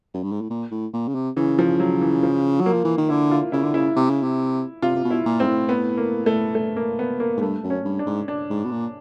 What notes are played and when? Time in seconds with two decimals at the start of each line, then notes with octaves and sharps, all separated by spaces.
0.14 F#2
0.23 G2
0.32 G#2
0.41 A2
0.50 A#2
0.71 A2
0.94 A#2
1.08 C#3
1.15 C3
1.37 C#3 E3
1.59 F3
1.80 F#3
2.01 E3
2.23 F3
2.61 F#3
2.66 A#3
2.73 F3
2.85 E3
2.98 D#3
3.09 D3 E4
3.31 F4
3.52 C#3 E4
3.63 D3
3.73 C#3 E4
3.96 C3
4.10 C#3
4.23 C3
4.82 C3 F4
4.95 C3
5.04 B2
5.11 E4
5.26 A#2
5.40 G#2 C4
5.47 A2
5.69 B3
5.98 A#3
6.26 A3
6.55 A3
6.77 A#3
6.99 B3
7.20 A#3
7.37 G#2
7.41 G2 A3
7.64 F#2
7.70 C#4
7.85 G2
7.99 D4
8.06 G#2
8.28 D4
8.50 G#2
8.65 B2
8.71 A#2